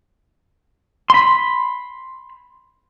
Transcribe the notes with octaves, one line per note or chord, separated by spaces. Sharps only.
B5 C6